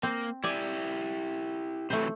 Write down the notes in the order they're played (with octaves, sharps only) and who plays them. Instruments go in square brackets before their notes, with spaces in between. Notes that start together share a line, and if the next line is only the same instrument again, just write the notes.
[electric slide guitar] A#3 [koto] C4
[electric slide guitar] E4 G4 [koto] D5 G#5
[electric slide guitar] C3 E3 F#3 [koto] A3 C5